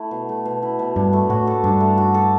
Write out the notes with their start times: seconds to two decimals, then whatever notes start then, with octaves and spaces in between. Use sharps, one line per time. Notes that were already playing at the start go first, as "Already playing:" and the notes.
Already playing: A3 E4
0.11 B2
0.29 A3
0.45 B2
0.63 E4
0.79 B2
0.96 G2 D4
1.13 A3
1.29 A2 F#4
1.47 A4
1.64 G2 D4
1.80 A3
1.98 F#4
2.14 A4